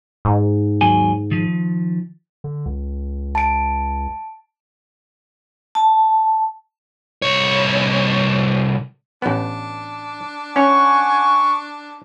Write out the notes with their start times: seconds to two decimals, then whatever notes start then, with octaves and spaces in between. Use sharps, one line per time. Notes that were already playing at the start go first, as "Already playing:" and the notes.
0.25 G#2
0.81 D#2 F#3 G#5
1.31 D#3 F3
2.44 D3
2.66 C#2
3.35 A5 D7
5.75 A5
7.22 C2 C#5
9.22 A1 B3 D4
10.56 C#4 C#5 F#5 G#5 C#6